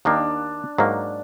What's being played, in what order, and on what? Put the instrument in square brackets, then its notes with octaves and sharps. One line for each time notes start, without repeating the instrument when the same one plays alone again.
[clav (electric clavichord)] D#2 D#3 A#3 [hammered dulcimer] D4
[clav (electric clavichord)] G#2 F#3 A#3